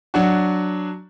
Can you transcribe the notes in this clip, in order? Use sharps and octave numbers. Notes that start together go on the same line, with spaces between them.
F#3 D4 F#4